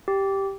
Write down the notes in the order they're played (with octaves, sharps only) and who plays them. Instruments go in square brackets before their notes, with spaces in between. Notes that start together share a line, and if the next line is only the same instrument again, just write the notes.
[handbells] G4